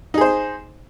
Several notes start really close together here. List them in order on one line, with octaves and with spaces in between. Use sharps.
D#4 G#4 C5